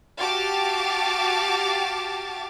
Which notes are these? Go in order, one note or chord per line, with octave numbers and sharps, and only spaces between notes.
F#4 G4 F5 A5 D6 A6